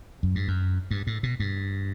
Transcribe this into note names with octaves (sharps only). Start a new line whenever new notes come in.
F#2
G2
F#2
G2
A2
B2
G2